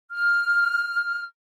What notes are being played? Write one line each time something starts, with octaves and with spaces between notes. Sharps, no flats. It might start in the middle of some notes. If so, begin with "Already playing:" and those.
F6